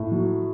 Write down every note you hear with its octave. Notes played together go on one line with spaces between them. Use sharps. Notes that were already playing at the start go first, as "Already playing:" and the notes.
Already playing: A2
F#3